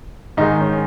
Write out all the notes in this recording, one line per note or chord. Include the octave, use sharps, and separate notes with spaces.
G#2 D#3 G#3 D#4
C#4